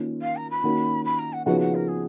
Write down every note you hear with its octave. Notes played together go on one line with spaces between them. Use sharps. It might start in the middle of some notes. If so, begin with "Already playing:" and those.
Already playing: D#3 A#3 C#4 F4
F5
A#5
B5
D#3 A#3 C#4 F#4
B5
A#5
F#5
C#3 F3 B3 D#4 F#4 F#5
F#5
A#4
G#4